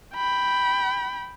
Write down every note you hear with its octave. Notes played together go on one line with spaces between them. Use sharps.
G5 B5